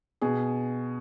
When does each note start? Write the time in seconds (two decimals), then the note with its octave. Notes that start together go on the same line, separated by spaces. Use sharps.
0.21 B2 G#4